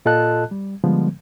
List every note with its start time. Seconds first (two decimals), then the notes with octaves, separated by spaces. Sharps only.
0.05 A#2 F4 A4 D#5 A5 F#6
0.51 G3
0.84 D3 F3 G3 G#3 B3